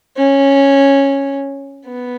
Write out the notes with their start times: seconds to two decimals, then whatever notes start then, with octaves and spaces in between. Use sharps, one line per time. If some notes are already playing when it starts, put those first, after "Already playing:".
0.17 C#4
1.86 B3